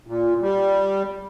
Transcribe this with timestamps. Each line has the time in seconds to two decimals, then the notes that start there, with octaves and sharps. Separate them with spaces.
0.07 A#2
0.41 G3